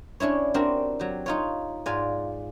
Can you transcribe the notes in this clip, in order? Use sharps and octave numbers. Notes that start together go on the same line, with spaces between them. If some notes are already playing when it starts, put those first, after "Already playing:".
C#4 D4 E4 C#5
C4 D4 F#4 G4 A#4
F#3 G4
D#4 F4 C#5
G#2 F4 D5 G#5